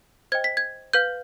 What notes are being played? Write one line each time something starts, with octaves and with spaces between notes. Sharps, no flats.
C5 D#5 G5 G#6
B6
G#6
B4 F5 G6